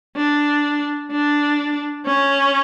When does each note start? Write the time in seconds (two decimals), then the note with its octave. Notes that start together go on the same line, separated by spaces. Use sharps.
0.16 D4
1.11 D4
2.06 C#4